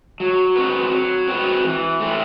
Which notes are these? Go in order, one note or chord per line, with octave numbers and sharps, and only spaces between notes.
F#3
C4 F#4 B4
F#3
C4 F#4 B4
E3
A3 C4 E4